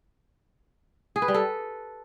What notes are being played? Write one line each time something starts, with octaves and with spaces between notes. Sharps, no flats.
G#4
B4
G3
A4